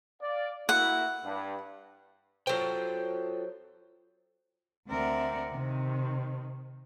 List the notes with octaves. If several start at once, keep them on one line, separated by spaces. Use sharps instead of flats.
D5 F5
A#3 E4 F#4 F#5
G2
F#3 F4 A4 C5 G5
D2 C4 A#4 D5 E5 F#5
C3 D#3